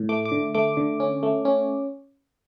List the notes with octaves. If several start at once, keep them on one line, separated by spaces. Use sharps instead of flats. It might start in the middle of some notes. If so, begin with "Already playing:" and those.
Already playing: A2
A3 D6
D6
D3
A3 D6
D3
C#4
A3
C#4